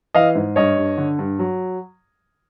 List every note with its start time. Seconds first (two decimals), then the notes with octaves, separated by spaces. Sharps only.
0.15 E3 D#5 F5
0.35 G#2
0.56 G2 C#5 D#5
0.78 G2
0.98 D3
1.19 G2
1.39 F#3